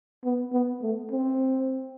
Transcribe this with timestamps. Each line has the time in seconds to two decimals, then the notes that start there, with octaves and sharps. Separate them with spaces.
0.24 B3
0.53 B3
0.82 A3
1.11 C4